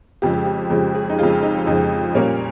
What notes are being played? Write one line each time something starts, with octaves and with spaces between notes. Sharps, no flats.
F2 C#3 F3 G#3 G4
G4
F2 C#3 F3 G#3
G#4
D#4
F2 C#3 F3 G#3 F4
D#4
F2 C#3 F3 G#3 D#4
A#2 G3 A#3 C#4